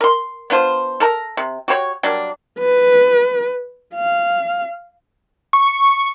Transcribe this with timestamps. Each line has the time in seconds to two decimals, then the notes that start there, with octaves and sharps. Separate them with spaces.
0.01 A#4 C6
0.50 B3 D4 F4 C5
1.00 A4 A#4 A#5
1.37 C3
1.68 F#4 G4 C5 C#5
2.03 F#3 G3 A#3 D4
2.59 B4
3.95 F5
5.53 C#6